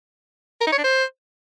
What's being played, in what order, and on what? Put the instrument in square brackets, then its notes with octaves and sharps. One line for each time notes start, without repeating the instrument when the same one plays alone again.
[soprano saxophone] A#4
D#4
C#5
D4
C5